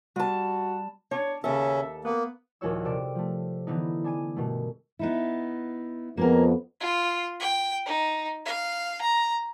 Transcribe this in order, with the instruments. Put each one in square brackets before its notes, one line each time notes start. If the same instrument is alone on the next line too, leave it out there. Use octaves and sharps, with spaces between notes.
[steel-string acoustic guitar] G3 A5 [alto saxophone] F#4
[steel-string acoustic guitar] D4 [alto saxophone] C#5
[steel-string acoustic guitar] D#2 A4 [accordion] C#3 C#4 [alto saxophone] E5
[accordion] A#3 [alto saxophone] B3
[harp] A#1 D#2 C#4 F#4 C#5 E6
C3 A4 D5 D7
F3 A3
D3 E3 B3 D#4
D4 G#5 D#7
G2 B2 D#3 A3
[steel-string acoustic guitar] B3 D#4 E4
[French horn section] F2 B3 [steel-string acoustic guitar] A#3 G#4 A#4
[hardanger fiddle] F4
G5
D#4
F5
A#5